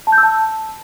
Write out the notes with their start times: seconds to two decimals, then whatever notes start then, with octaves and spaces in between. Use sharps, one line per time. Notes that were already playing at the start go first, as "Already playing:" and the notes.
0.07 A5
0.12 G6
0.18 E6
0.23 A5